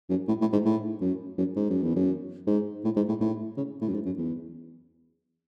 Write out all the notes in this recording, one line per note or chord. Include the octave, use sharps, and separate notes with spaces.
F#2
A2
A2
G#2
A2
F#2
F#2
G#2
F#2
E2
F#2
G#2
A2
G#2
A2
A2
C#3
A2
F#2
G#2
F#2
E2